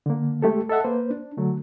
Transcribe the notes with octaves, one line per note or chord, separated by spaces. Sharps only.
D3 A#3
G#3 A3 G4 A4
A4 D#5 E5 F#5
A#3 B4 C5
D4
D3 F#3 A3